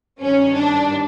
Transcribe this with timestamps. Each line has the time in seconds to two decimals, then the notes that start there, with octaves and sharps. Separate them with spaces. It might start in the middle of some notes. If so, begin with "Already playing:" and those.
0.20 G2 D#3 G3 C#4
0.55 D4